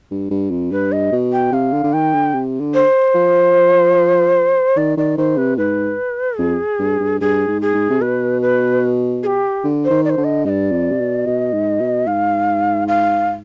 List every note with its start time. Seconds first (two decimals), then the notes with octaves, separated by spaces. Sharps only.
0.11 G2
0.31 G2
0.51 F2
0.72 G2 B4
0.92 D#5
1.12 B2
1.33 G5
1.52 C3 F5
1.73 D3
1.84 D3
1.93 D#3 G5
2.14 D3
2.34 C3
2.60 D3
2.74 C5
3.15 F3
4.77 D#3 D5
4.98 D#3 D5
5.17 D#3 C5
5.38 C3 B4
5.58 G#2 B4
6.39 F2 G#4
6.79 G2
7.00 G2
7.21 G2 G#4
7.48 G#2
7.62 G#4
7.74 G#2
7.90 C3
8.01 B2 B4
8.42 B4
9.23 G#4
9.27 G4
9.64 D3
9.85 C5
9.90 D#3
10.05 D5
10.10 C5
10.18 D3
10.24 D#5
10.45 G2 D5 D#5
10.72 F2
10.92 C3
11.00 B2
11.26 B2 D#5
11.53 G#2
11.80 B2
12.06 G#2 F5
12.88 F5